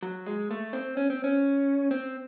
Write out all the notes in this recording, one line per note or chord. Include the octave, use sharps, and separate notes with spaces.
F#3
G#3
A3
C4
C#4
C4
C#4
C4